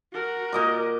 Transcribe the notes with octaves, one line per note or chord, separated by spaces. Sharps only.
F#4 A#4
A#2 D#5 D6